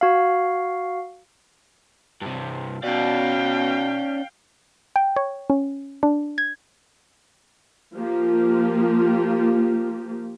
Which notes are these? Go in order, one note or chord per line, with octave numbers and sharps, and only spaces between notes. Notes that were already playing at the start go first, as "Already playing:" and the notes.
F#4 F5
G2 C3
B2 C#4 D5 F5 G5
G5
C#5
C#4
D4
G#6
F3 A#3 F4 G4